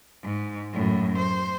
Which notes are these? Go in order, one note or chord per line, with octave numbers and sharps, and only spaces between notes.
G#2
F#2 A2
C5